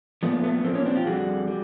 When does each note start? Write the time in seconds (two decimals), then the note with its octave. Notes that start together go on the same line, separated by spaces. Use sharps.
0.23 A#2 F3 A3 B3
0.44 A3 B3
0.64 A#2 F3 A#3 C4
0.75 B3 C#4
0.86 C4 D4
0.95 F4 G4
1.06 F2 D3 G3 F#4 G#4
1.48 G3